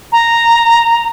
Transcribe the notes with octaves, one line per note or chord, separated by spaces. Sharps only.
A#5